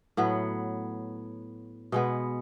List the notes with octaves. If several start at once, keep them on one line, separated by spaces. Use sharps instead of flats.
A2 F#3 B3
B2 G#3 B3